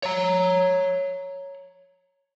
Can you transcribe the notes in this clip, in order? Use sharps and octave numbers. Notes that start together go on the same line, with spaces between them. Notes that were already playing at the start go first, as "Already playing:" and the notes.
C#5 A#5